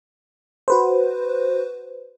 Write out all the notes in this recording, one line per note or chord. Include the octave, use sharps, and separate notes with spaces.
F#4 B4 C5